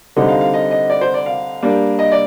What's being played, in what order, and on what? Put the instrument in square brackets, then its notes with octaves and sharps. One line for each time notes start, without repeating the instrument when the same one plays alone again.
[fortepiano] D3 G3 C4 D#4 D#5
F5
F5
D#5
D#5
D5
C5
D5
F5
G3 A#3 D4
D#5
D5